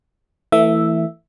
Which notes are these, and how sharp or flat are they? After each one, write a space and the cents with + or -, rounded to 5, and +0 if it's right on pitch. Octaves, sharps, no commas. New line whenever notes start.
E3 +0 A3 +25 E5 +0